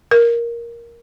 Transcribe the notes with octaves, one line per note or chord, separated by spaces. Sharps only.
A#4